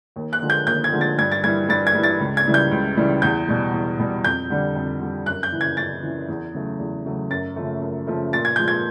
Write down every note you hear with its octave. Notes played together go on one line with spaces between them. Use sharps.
D#2
F#6
D3 F3 G#3
G6
D#2 G6
G#6
D3 F3 G#3
A6
G2 G#6
A6
E3 G3 G#6
G2 A6
G#6
E3 G3
A6
C#2
G#6
C#3 E3 G3
G6
C#2
C#3 E3 G3
E2 G6
B2 G3
E2
B2 G3
F2 G6
D3 G3
F2
D3 G3
F#2 F#6
G6
C#3 E3
G#6
F#2 A6
C#3 E3
E2
C#3 F#3 A3
E2
C#3 F#3 A3
F#2 A6
C#3 F3 A3
F#2
C#3 F3 A3
A#2 A6
G#6
F3 G#3 G6
G#6